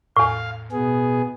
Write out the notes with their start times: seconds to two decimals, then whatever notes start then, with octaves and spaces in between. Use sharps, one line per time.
0.17 E2 A2 F5
0.72 B2 B3 G#4